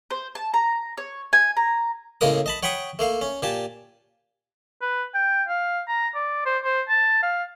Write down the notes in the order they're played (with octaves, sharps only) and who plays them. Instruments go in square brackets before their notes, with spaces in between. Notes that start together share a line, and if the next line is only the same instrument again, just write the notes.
[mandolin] C5
A5
A#5
C#5
G#5
A#5
[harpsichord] A2 C#3 G#3 A#3 A#4 D#6
D#5 A5 B5
C#5 F#5 G5 B5 C#6 D#6
A3 A#3 F5
C#4
A#2 G4 G#5 A5
[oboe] B4
G5
F5
A#5
D5
C5
C5
A5
F5